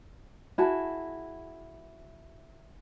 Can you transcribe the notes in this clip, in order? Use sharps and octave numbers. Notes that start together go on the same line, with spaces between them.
E4 F#4 G#4 A5